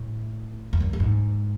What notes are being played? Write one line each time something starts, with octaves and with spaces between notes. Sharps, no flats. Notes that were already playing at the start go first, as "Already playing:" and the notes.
Already playing: A2
E2
F#2
F#2
G#2